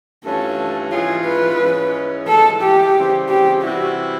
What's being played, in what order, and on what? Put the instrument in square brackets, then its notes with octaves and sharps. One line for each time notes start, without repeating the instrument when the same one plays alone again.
[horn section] G2 E3 A3 C#4 F4 [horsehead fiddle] A4
[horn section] G#2 E3 G#3 C#4 F4 [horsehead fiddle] G#4
[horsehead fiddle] B4
[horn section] G#2 E3 G#3 C#4
[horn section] G#2 E3 G#3 [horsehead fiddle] A4
[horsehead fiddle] G4
[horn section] C#3 E3 G3 C4
[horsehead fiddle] G4
[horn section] C3 E3 G3 C4 E4 [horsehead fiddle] F#4